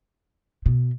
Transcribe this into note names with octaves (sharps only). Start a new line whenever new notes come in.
B2